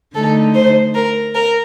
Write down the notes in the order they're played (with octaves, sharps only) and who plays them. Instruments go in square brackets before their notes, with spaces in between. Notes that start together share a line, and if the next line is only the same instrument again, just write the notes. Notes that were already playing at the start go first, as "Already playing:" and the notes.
[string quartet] D3 A3 D#4 A4
C5
A#4
A#4